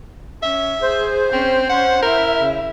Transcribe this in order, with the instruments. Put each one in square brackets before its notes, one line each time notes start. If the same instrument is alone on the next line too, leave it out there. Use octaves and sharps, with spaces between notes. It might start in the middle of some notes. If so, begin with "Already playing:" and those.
[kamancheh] C#4 [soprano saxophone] E5
[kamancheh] G#4 [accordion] C5
[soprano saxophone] C4 [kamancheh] C#4
[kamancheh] C#4 C6 [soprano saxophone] F#5
[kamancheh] E4 E5 [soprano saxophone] A#4
[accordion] C#3